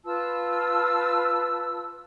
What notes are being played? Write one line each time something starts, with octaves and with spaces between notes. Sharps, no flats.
F4 B4 A5 E6